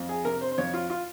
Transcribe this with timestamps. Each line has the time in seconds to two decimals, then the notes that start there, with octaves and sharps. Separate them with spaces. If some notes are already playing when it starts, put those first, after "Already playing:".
Already playing: F2
0.09 G#4
0.25 C3 A#4
0.41 C5
0.52 C5
0.58 F2 C#5
0.74 F4
0.90 F4